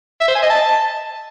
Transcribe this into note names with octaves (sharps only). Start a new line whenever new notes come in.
E5
C5
G#5
D#5
A5